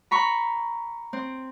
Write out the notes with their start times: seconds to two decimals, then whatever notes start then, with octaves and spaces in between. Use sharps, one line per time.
0.11 A#5 B5 C#6
1.13 C4